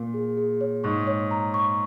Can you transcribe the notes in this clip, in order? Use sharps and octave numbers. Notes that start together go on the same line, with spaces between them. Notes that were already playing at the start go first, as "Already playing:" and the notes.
Already playing: A#2
G#4
G#4
C#5
G#2 C#6
C#5
A#5
C#6